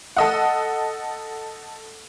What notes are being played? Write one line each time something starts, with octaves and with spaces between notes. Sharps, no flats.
A4 D#5 F#5